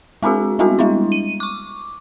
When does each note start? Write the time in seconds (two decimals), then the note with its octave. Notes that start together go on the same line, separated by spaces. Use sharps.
0.22 G#3 C4 D4 F#4 G#4
0.59 G3 G#3 B3 C4 D4 F#4
0.79 G3 G#3 D4 E4
1.12 D#7
1.40 C#6 D6